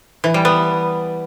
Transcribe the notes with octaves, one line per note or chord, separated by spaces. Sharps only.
E3
G3
B3